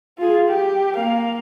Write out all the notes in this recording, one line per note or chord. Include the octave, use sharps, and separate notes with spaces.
F4 G#4
G4
A#3 F5